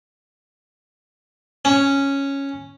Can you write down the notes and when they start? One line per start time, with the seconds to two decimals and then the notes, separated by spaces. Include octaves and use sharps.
1.65 C#4